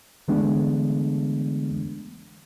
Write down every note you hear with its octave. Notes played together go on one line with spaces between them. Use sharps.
D3 E3 G#3 A3 B3 D4